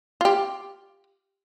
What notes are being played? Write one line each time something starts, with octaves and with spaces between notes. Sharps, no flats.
F4 G4